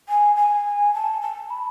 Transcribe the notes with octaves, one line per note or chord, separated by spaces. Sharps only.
G#5
G#5
A5
A5
B5